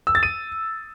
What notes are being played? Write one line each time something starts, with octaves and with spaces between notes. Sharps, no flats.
E6
A6
D#7